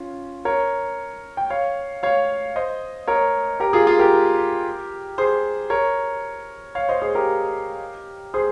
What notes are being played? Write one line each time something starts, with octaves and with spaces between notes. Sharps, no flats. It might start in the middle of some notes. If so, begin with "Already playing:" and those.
Already playing: C#4 F4
A#4 C#5
G5
C#5 F5
C#5 F5
C5 D#5
A#4 C#5
G4 A#4
F4 G#4
F4 G#4
G4 A#4
G#4 C5
A#4 C#5
C#5 F5
C5 D#5
G#4 C5
G4 A#4
G#4 C5